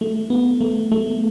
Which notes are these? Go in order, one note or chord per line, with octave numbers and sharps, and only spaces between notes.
A3
B3
A3
A3